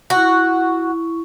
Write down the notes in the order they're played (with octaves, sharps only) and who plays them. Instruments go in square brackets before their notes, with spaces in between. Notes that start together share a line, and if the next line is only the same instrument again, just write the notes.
[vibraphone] E4 C#6 [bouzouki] F#4